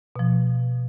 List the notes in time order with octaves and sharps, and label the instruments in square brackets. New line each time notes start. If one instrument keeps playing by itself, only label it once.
[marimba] B2 F3